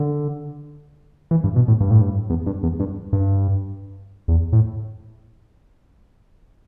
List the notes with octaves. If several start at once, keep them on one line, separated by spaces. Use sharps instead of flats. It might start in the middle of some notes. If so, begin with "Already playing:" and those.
Already playing: D3
E3
G2
B2
A2
G2
A2
G2
E2
G2
E2
G2
G2
E2
A2